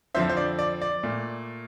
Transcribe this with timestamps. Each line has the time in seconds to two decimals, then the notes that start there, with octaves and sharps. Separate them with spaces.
0.15 F2 D3 F3 C4 C5 E5
0.29 C5
0.37 D5
0.59 D5
0.81 D5
1.03 A#2 A3